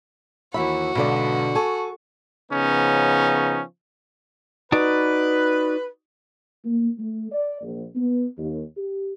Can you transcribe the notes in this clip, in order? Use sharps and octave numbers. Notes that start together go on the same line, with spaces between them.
D#2 E3 F#4 E5 B5
B1 G#2 B2 D3 B3 D5
A4 G#5 A5 C#6
C#3 F3 B3 C#4 D#4
D#4 F#4 B4 D5
A#3
A3
D5
A#1
B3
D#2
G4